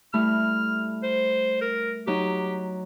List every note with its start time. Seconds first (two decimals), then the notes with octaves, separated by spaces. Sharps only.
0.14 G3 A3 E4 F6
1.03 C5
1.61 A#4
2.07 F#3 D#4 G4